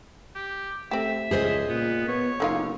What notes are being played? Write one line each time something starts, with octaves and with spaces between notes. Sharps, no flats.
G4
A3 C4 G4 E5
C#2 G#4 C5 D#5
A#2 B3
B3 C#5
F#1 D3 D#3 F4